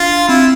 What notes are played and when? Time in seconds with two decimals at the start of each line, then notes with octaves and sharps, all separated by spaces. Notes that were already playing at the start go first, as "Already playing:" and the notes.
Already playing: D4 F4
0.28 C4 E4